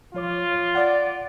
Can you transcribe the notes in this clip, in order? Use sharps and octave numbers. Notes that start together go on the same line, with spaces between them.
F3 F4 C#5 D6
D5 F#5 D6